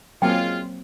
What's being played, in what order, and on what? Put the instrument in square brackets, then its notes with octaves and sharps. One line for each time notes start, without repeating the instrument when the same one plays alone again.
[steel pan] F#3 A#3 C4 [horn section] G#3 F4 [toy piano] G5